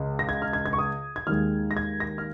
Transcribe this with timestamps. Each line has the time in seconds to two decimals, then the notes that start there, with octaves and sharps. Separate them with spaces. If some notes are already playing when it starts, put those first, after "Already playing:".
Already playing: C#2 C#3
0.19 A#6
0.29 G#6
0.42 F6
0.53 G#6
0.66 G#6
0.73 C#6
0.79 D#6
1.16 G#6
1.27 D#2 D#3 G#3 F6
1.71 A#6
1.77 G#6
2.00 A#6
2.18 F6